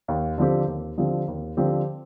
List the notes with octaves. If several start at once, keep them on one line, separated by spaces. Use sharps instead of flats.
D#2
D3 F3 C4 G4
D#2
D3 F3 C4 G4
D#2
D3 F3 C4 G4